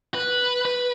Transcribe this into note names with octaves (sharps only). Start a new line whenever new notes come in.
B4
B4